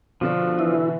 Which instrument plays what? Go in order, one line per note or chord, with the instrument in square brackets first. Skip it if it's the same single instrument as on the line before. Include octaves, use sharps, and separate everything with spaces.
[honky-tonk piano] B2 D3 D4 [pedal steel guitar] F3
[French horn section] E3 [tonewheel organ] E4